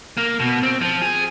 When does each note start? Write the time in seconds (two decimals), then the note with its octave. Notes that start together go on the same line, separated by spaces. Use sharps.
0.17 A#3
0.40 B2
0.63 C4
0.81 F3
1.02 G#4